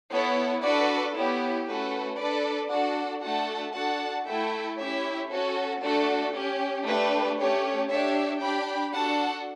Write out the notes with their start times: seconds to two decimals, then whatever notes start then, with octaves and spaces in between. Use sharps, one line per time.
0.11 B3 E4 A4 C#5
0.63 D4 F#4 A4 B4 D5
1.15 B3 E4 G4 C#5
1.67 A3 C#4 F#4 A4 B4
2.18 D4 A4 B4 D5
2.70 D4 F#4 A4 D5 F#5
3.22 A3 D4 F#4 A4 F#5 A5
3.74 D4 F#4 A4 F#5 A5
4.27 A3 E4 A4 E5 G5
4.79 C#4 E4 G4 C#5 E5
5.31 C#4 F#4 A4
5.82 A3 D4 F#4 A4
6.34 C#4 G4
6.86 A3 D4 G4 B4
7.38 A3 C#4 G4 C#5
7.90 D4 G4 C#5 E5
8.41 D4 G4 G5 B5
8.93 D4 F#4 A4 F#5 A5